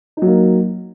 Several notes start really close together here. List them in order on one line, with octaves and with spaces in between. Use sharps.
D#4 F#3 A#3